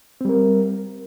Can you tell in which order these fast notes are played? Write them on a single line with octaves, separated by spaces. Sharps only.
C4 G3 A#4